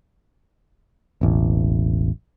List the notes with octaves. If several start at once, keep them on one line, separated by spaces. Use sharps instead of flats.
E1 A1